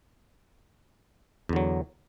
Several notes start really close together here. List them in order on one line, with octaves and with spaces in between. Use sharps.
E2 D3 F#3